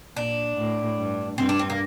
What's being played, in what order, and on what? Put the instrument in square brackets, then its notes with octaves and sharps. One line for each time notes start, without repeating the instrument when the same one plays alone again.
[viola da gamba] A#2 [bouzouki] D4
[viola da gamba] A2
G2
[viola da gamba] G2 [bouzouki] C4
[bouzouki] D4
C4
A#3